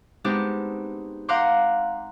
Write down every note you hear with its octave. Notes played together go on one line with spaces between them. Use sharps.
G#3 B3 C4 D4 D#4 G4
F5 F#5 A#5 C6 D6 G6